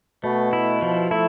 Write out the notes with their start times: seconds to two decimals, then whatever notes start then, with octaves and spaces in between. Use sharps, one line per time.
0.23 B2 A3
0.53 E4
0.82 F3
1.11 A3 E4